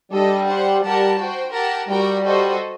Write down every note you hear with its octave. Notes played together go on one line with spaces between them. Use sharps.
G3 D4 A4 D#5
G4 C5 F#5
G3 G4 A#4 F#5 A5
F#4 C5 G5
G4 A#4 F#5 A5
G3 F#4 A#4 D5 G5
F#4 A4 C5 D#5